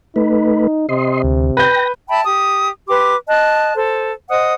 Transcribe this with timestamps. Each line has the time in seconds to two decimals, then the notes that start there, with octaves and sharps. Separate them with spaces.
0.16 A3 D#4 B4
0.89 C3 D#5 C6
1.24 D2
1.57 B4 G5 G6 A#6
2.09 E5 G5 A5 B5
2.24 G4 D#6
2.88 G4 B4 C6 D6
3.28 D#5 A5 F#6
3.76 A4 C5
4.30 C5 D#5 F#5 D#6